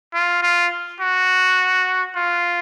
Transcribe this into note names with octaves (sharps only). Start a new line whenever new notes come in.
F4
F4
F#4
F4